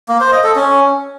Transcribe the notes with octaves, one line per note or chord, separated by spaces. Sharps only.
A#3
C5
D#5
A4
C#4